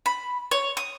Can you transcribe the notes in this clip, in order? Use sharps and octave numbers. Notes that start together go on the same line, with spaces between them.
B5
C#5
D#6